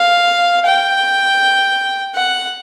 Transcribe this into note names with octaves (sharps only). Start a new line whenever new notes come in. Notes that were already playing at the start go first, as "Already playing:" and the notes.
Already playing: F5
G5
F#5